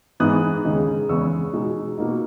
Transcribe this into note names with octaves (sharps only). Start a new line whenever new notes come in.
G#2 E3 B3 D#4 D#6 F#6
D#2 C#3 G#3 D#4
E2 C#3 G#3 B3 C#6 E6
B2 G#3 D#4
B2 A#3 D#4